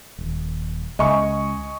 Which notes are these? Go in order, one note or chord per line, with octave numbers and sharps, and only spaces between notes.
D#1
C#2 D#5 G#5 C#6